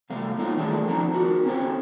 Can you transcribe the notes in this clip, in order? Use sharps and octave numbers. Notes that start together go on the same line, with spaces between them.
C3 G3 A3 F5
G3 A#3 D#4 F4 C#5 G5
D#3 A3 C#4 D4 G#4 A4
F3 C4 D4 D#4 A#5
D#4 F4 F#4 A#4
C4 C#4 G4 A4 C5 C#5